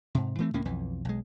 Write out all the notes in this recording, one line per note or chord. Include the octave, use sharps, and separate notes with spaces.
G#2 C3
E3 A3 C4
C#2 A2 A#3 C#4
B1 F2 E3
B1 G#3